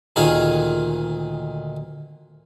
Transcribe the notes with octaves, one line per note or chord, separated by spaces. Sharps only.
D2 A#2 D#3 G#4 F5